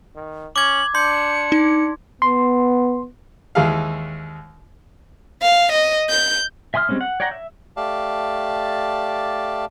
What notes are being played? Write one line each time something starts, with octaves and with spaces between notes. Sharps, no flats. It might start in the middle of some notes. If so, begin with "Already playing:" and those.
D#3
C#4 D6 G#6 F#7
D4 C6 G6 C#7
D#4
B3 C6
D#2 E3 G#3 F5
F5
D#5
G6
E5 G#5 C6 D#6 F6
G3 G#3 C4 C#4
F#5
C#5 D5 F#5 G5 A#5
E5
A3 G4 D5 F5 A5